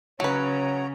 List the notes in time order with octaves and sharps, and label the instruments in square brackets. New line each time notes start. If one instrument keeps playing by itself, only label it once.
[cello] C#3 [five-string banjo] F#3 B4 [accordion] C#5 A#5